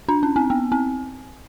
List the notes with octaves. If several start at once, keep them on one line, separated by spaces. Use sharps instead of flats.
D4
C#4
C4
B3
C4